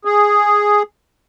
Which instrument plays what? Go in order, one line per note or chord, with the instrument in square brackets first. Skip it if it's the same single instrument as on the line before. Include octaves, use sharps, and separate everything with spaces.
[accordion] G#4